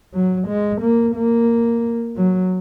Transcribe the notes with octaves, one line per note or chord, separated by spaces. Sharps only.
F#3
G#3
A#3
A#3
F#3